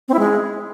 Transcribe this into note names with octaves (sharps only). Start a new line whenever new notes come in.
C4
E4
G#3